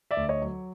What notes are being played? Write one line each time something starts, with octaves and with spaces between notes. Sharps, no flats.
D5 E5
D2
C#5 D#5
F#3